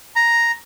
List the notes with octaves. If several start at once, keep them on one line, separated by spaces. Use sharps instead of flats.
A#5